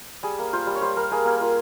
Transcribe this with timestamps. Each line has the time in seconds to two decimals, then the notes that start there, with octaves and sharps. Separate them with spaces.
0.23 G3 G#4
0.39 A#3
0.53 F4 C5
0.67 G3
0.75 C#5
0.81 G3 C5
0.96 G3 A#4
1.11 A#3 G#4
1.25 A#3 A#4
1.41 F4